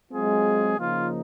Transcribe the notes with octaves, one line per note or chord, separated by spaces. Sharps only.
F#3 G#3 C4 F4 G#4
C#3 F3 A#3 D#4 F4